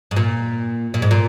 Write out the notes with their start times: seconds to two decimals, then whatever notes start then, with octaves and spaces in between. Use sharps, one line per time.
0.11 G#2
0.16 A#2
0.94 A#2
1.02 G#2
1.11 A#2